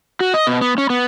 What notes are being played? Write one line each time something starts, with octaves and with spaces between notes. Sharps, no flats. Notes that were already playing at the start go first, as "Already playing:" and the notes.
F#4
D#5
B2
B3
C#4
B3